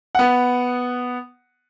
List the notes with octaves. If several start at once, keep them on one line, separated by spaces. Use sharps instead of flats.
B3 F#5